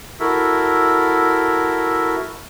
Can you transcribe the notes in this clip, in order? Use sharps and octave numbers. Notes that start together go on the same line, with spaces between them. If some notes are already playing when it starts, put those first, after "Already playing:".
E4 F#4 A4 A#4 E5